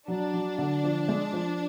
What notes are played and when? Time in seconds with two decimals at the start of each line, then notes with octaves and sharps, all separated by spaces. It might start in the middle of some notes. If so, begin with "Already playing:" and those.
0.08 F#3 D4
0.34 F#3
0.58 D3
0.84 F3
1.08 G#3
1.33 F3